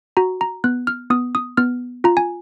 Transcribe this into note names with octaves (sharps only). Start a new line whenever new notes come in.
F#4 A#5
A#5
B3 F#6
F6
B3 D#6
D#6
B3 F6
F4 A#5
G#5